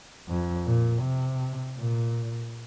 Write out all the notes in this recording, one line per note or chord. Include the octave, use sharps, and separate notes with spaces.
F2
A#2
C3
A#2